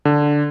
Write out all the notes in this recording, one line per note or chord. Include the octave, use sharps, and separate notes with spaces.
D3